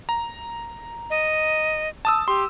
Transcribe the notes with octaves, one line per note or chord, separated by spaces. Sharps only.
A#5
D#5
A5 D#6 E6
G4 C6